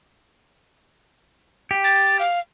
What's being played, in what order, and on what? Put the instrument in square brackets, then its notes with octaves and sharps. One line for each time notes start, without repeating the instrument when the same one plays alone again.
[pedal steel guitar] G4
[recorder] A6
F5